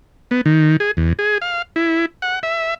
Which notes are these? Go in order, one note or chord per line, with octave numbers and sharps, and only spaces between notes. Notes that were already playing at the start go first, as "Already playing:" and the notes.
B3
D#3
G#4
E2
G#4
F5
E4
F#5
E5